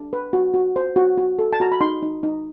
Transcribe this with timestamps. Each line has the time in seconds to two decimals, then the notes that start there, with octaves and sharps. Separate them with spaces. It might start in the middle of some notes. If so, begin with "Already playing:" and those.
Already playing: D4
0.13 B4
0.33 F#4
0.54 F#4
0.76 C5
0.96 F#4
1.17 F#4
1.39 A4
1.53 A5
1.60 F#4 A#5
1.72 B5
1.81 D#4 C6
2.03 D#4
2.23 D#4